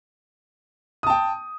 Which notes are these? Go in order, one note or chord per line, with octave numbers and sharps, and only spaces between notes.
G5 A5 D#6